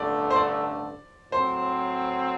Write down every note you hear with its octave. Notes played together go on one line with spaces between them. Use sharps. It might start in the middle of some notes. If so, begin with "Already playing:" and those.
Already playing: A1 G2 D3 A3 D5
C5
D5
A2 F#3 C4 C5